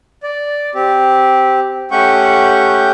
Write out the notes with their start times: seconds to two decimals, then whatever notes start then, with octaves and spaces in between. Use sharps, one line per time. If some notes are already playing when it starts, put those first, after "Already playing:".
0.23 D5
0.75 C4 G4
1.91 A3 C#4 G4 F#5 C#6 G6